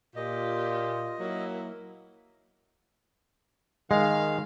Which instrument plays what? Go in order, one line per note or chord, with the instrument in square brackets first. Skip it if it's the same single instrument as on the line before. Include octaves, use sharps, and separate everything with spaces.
[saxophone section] A#2 [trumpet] F4 [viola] G4 [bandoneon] D#5
[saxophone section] F#3 A#3 [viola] E4 A#4
[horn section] D#3 F5 [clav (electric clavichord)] G#3